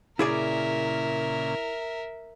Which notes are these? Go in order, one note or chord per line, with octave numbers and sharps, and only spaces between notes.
A#2 C#3 E4 G#4 A#4 D5 E5